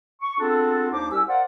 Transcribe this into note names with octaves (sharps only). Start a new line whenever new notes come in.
C#6
B3 C4 D4 F4 G#4 A4
D#2 D4 D#4 C5 D6
C2 C#4 G4 E6
A#4 C5 D5 F5 F#5